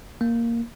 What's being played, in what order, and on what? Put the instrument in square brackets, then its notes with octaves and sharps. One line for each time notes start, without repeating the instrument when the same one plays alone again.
[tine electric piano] A#3